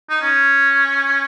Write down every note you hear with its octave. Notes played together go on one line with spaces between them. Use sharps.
D#4
C#4